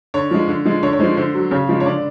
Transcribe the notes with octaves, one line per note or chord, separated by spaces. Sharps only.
D3 C#5
F3 G#3
D3
F3 G#3
D3 C#5
C#5
F3 G#3 C5
D3 C5
F#3
C#3 C#5
F3 G#3
C#5
D3 D5